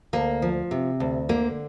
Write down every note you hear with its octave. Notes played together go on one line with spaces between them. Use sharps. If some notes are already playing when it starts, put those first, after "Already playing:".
D2 A#3
F3
C3
D2
D3 A#3